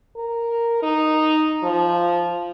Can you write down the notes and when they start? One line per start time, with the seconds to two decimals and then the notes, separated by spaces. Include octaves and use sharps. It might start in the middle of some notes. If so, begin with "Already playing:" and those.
0.17 A#4
0.83 D#4
1.63 F3